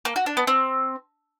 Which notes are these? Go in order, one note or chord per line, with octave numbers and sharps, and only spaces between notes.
A#3
F#4
D4
B3
C4